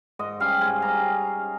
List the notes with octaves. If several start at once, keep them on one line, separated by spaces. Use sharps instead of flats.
G#2 D#5
G3 C#4 F5
G#2 G#5
G3 C#4 A#5